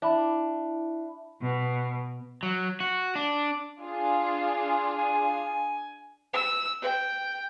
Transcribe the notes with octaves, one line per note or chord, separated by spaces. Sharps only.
D4 E4 E5 B5
B2
F#3
F#4
D4
D4 F4 G#4
G#5
E6
G5